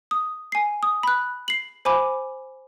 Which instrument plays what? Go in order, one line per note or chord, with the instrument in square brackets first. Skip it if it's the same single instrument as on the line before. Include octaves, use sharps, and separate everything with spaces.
[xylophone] D#6
G#5 C7
D#6
B5 F#6
C7 F#7
C5 G#5 B5 D6